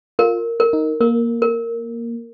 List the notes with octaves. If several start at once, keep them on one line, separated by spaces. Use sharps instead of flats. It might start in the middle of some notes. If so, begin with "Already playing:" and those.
F4 A#4
A#4
D#4
A#3 A#4
A#4